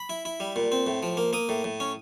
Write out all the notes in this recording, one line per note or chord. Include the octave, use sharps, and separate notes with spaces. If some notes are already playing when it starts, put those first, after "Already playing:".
Already playing: B5
E4
E4
G3
A#2
C4
A2
F3
A#3
A#3 D#6
A2
A2
C#4